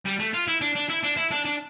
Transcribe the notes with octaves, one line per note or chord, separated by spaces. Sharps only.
G3
A3
F4
E4
D4
D4
E4
D4
E4
D4
D4